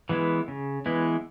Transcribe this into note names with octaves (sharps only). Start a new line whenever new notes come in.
E3 G#3 B3 E4
C#3
E3 G#3 B3 E4